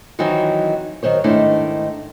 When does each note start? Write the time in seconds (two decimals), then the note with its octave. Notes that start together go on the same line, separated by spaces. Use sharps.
0.19 D#3 E3 F#3 C4 D#4 F#4
1.03 D#3 F#3 C5 C#5
1.24 G#2 D#3 A3 D4 E4